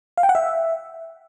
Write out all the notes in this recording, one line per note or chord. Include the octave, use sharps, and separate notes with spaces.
F5
G5
F#5
E5